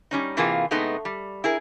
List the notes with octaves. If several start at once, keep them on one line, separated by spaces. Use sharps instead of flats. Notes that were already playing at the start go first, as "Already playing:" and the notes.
G3 C#4 D#4
C3 E3 A#3 F4 G#4
C3 G#3 A3 B3 D#4
G3
E4 G#4 A#4